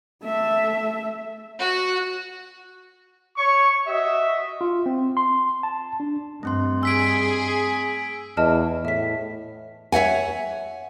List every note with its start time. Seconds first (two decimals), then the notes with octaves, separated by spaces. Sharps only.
0.23 A3 E5
1.59 F#4
3.37 C#5 C#6
3.87 F#4 D#5 E5
4.61 F4
4.86 C4
5.17 C6
5.63 A5
6.00 D4
6.43 G2 A3 C4 C6
6.83 G#4 E6 B6 D7
8.37 E2 D#5 A5 F6
8.85 A2 E5 B6
9.92 C#5 E5 F#5 G#5